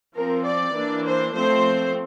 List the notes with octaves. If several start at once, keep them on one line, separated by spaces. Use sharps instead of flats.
F3 C4 A#4
D5
E3 A#3 D4
C5
F3 A3 C4 C5